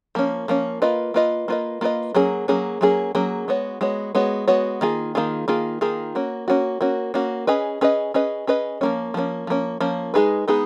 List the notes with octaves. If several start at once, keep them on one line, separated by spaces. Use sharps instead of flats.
F3 A#3 C#4
F3 A#3 C#4
A#3 F4 B4 D#5
A#3 F4 B4 D#5
A#3 F4 B4 D#5
A#3 F4 B4 D#5
F#3 A#3 C#4 G#4
F#3 A#3 C#4 G#4
F#3 A#3 C#4 G#4
F#3 A#3 C#4 G#4
G#3 B3 F#4 C#5
G#3 B3 F#4 C#5
G#3 B3 F#4 C#5
G#3 B3 F#4 C#5
D#3 A#3 F4 G#4
D#3 A#3 F4 G#4
D#3 A#3 F4 G#4
D#3 A#3 F4 G#4
A#3 C#4 F#4
A#3 C#4 F#4
A#3 C#4 F#4
A#3 C#4 F#4
C#4 G#4 B4 D#5
C#4 G#4 B4 D#5
C#4 G#4 B4 D#5
C#4 G#4 B4 D#5
F3 A#3 C#4
F3 A#3 C#4
F3 A#3 C#4
F3 A#3 C#4
G#3 B3 D#4 G#4 B4
G#3 B3 D#4 G#4 B4